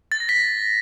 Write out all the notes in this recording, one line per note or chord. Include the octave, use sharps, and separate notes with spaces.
A6
A#6
B6